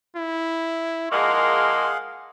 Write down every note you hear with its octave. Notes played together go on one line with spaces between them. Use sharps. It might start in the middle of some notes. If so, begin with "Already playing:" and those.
E4
F3 G#3 A#3 G#4 A#4 F5 F#5 C6